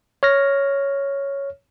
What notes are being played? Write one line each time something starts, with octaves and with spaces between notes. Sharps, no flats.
C#5 F6 A#6